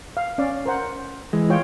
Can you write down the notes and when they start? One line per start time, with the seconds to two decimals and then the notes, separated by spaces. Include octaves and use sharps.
0.17 F5
0.38 C#4 D5 F5
0.66 A#4 C5 F#5
1.33 E3 G#3
1.50 F4 C#5 G5